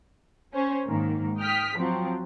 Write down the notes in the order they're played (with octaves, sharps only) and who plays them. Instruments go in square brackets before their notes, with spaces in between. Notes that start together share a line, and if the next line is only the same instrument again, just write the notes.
[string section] C#4 C5
G#2 D#3 A#3
G5 D#6 F6 B6
F3 F#3 C4